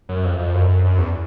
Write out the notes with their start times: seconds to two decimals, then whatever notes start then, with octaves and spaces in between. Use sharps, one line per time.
0.09 F#2
0.24 F2
0.39 F2
0.54 F#2
0.68 F#2
0.84 F#2
0.98 E2